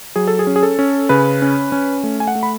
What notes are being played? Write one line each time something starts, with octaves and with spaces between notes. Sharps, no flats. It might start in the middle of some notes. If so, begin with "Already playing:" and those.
F#3 G#4
A4
G#4
C#4
G#4
A4
C#4
C#3 B4
C#4
C#4
A3
G#5
F#5
A3
B5